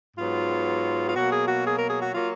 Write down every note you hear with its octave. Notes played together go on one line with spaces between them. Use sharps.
G#2 F#3 B3 F4
F4
B2 F#3 A#3 F#4
G#4
F#4
G#4
A#4
G#4
F#4
F#3 A#3 F4